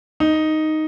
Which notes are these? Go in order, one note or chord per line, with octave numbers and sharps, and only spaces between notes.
D#4